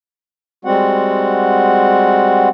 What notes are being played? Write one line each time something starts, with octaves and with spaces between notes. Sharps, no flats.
G3 G#3 C4 F#4 F#5